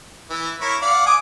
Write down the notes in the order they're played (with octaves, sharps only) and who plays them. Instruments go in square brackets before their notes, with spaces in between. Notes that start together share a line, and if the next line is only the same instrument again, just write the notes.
[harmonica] E3
E4 A#4 C#5
D5 F5 F#5
G#5 D6 D#6